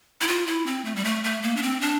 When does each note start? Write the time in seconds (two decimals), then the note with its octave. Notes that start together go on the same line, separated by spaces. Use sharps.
0.21 E4
0.28 F4
0.47 E4
0.66 C4
0.85 A3
0.96 G3
1.04 A3
1.24 A3
1.43 A#3
1.56 D4
1.62 C4
1.81 D4